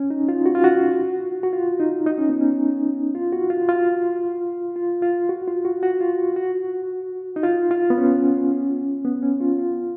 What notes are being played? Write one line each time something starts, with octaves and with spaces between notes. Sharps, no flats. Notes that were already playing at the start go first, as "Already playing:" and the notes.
Already playing: C#4
D#4
F4
F#4
F4
F#4
F#4
F4
D#4
D#4
C#4
B3
C#4
F4
F#4
F4
F4
F4
F4
F#4
F4
F#4
F#4
F4
F#4
F#4
D#4
F4
F4
B3
C#4
B3
C#4
F4
F4